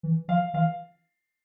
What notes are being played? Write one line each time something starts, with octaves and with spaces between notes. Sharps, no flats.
E3
F3 F5
E3 F5